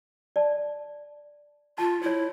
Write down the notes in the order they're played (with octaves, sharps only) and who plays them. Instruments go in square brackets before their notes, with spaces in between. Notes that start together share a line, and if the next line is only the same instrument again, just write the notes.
[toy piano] D5 A5
[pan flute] F4 [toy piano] A5
[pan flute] E4 [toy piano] C5 C#5